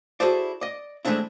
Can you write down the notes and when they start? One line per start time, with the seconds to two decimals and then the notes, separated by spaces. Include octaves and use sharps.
0.20 E4 F#4 G#4 A4 C5 D5
0.61 D5 D#5
1.05 E3 G#3 A3 C4 D4 E4